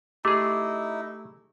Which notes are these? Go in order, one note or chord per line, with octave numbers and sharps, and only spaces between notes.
A3 D#4 E4 G4 G#4 D6